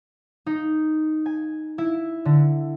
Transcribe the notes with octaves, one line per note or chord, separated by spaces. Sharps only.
D#4
G#5
E4
D3